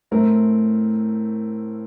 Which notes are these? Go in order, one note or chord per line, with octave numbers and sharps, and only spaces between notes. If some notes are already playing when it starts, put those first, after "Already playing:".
A2 A3 C4 A#4